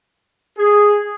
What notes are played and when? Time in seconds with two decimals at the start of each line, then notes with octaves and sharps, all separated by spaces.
0.57 G#4